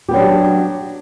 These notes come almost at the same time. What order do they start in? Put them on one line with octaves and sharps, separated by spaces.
G4 B3 F#3 D4